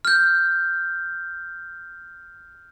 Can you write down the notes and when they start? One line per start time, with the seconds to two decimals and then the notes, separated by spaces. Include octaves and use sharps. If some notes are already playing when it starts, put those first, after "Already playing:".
0.05 F6 G6